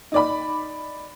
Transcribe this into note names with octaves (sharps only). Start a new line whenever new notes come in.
D#4 D5 B5